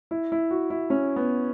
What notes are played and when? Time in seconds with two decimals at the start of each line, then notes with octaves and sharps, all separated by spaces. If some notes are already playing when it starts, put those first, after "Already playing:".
0.11 E4
0.32 E4
0.51 F#4
0.70 E4
0.90 C#4
1.16 B3